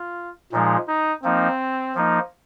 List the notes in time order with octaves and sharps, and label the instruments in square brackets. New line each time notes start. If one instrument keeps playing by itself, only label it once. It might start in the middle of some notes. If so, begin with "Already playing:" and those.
Already playing: [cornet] F4
[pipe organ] A#2 F3 G#3 [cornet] D#4
[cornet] D#4
[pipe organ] F3 A#3 D#4 [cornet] C4
[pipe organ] F3 A#3 D#4